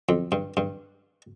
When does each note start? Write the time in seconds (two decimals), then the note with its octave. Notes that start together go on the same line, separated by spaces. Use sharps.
0.09 F2
0.32 G2
0.57 G2